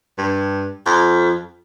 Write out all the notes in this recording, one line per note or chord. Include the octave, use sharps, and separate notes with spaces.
G2
F2